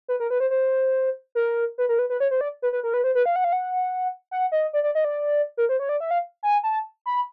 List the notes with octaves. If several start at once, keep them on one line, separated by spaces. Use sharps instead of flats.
B4
A#4
B4
C5
C5
A#4
B4
A#4
B4
B4
C#5
C5
D5
B4
B4
A#4
B4
C5
B4
F5
F#5
F5
F#5
F#5
D#5
D5
D5
D#5
D5
A#4
C5
C#5
D5
E5
F5
G#5
A5
B5